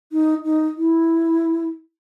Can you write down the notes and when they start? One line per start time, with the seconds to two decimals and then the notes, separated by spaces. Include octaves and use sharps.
0.12 D#4
0.44 D#4
0.77 E4